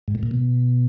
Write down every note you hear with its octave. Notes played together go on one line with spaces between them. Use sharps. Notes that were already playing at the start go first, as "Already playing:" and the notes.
G#2
A2
A#2
B2